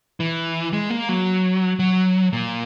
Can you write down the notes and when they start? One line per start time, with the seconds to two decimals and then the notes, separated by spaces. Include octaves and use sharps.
0.20 E3
0.73 G#3
0.90 A#3
1.09 F#3
1.79 F#3
2.33 A#2